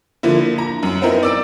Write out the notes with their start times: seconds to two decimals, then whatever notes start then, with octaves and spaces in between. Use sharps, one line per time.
0.23 D3 F3 A#3 E4
0.58 A#5
0.83 F#2
1.02 B3 C4 D#4 E4 A#4
1.23 D5 E6 D7